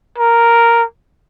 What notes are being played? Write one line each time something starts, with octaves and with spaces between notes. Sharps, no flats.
A#4